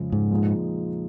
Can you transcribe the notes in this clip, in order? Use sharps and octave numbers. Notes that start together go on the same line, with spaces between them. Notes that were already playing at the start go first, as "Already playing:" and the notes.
Already playing: F2 C#3 F3 G#3
G#2
A#2 F3 G#3 D#4 G#4